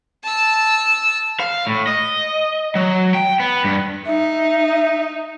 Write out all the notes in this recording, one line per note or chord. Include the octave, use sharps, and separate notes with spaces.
A5 E6
F5
A2
D#5
F#3
G5
B3
G2
D#4 E5